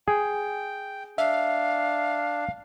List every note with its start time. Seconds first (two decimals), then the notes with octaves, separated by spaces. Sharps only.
0.08 G#4 G5
1.18 D4 E5 F5